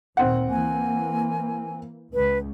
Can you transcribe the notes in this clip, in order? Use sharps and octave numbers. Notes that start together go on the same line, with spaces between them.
D2 A#2 D#3 C4 F#5
E3 A#3 G#5
C#2 B4